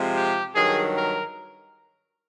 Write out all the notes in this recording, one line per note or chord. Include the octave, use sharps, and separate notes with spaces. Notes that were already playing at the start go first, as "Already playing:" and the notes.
Already playing: C3 F3 G#3
G4
G2 D#3 F#3 G#4
A#4